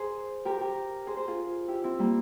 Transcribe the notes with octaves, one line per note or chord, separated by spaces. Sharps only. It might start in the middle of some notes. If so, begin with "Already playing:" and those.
Already playing: G#4 A#4 C5
G4 A#4
G4 A#4
G#4 C5
G#4 C5
F4 G#4
E4 G4
C4 E4
G3 A#3